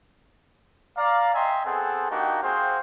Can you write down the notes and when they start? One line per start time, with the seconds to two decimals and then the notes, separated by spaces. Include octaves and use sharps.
0.97 D5 F5 A#5
1.34 D#5 E5 G5 G#5 A#5 C6
1.65 B3 C4 G#4 A4 F#5
2.11 A#3 D4 D#4 F#4 G4 G5
2.42 C4 F#4 G#4 C5 F5 G5